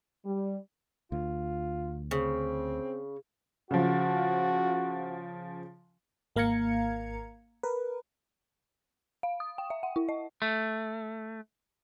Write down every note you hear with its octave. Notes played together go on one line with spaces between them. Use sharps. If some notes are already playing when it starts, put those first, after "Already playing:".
G3
D2 F4
C#3 C4
C#3 F3 F#4
G#1 A#3 F5 A#5 G#6 C#7
A#4 B4
F5
D#6
G5
E5
F#5
E4
D#5
A3